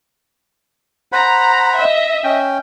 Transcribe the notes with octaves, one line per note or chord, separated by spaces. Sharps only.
C5 F#5 A#5 B5
D#5 E5
C#4 G5